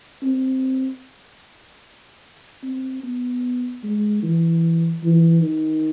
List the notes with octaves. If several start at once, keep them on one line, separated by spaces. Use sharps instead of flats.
C4
C4
B3
G#3
E3
E3
D#3